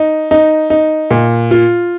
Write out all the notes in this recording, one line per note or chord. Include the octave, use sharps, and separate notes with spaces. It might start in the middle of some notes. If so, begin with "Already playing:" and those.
Already playing: D#4
D#4
D#4
A#2
F4